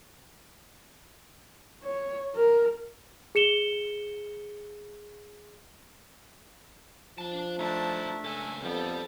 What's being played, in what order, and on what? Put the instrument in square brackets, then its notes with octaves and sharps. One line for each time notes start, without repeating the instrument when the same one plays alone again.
[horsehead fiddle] C#5
A#4
[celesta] G#4 C#7 E7 G7
[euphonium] F3 [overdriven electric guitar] D4 A5
[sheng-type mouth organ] A3 E5 [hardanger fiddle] D4 A5 [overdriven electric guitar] D#4 F4
[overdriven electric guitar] C#2 A4 [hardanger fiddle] G#5
[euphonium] F2 [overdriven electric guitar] G3 D5 [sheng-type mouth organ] B3 [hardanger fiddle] A4